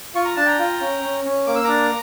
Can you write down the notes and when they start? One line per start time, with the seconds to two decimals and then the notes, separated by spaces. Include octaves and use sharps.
0.15 F4 C#6
0.25 A#5
0.37 D4 A5
0.46 G5 A#5
0.59 F4
0.81 C#4
1.02 C#4
1.25 C#4
1.46 A#3 D6
1.55 E6
1.64 D4 A#5 D6